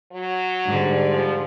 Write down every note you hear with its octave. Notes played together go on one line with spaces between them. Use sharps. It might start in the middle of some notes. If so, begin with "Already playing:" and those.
F#3
G#2 D3 G3 D4
F3